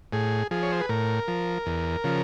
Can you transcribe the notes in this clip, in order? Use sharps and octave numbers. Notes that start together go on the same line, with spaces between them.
A2 G#4
F3 G#4
C#5
C5
B4
A2 A#4
F3
E2
C#3 F3